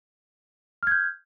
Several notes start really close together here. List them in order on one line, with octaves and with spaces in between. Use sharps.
F6 G#6 G6